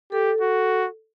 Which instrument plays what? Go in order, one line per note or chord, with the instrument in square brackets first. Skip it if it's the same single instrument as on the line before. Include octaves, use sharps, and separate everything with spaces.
[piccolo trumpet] G4 [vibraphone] A4
[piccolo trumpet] F#4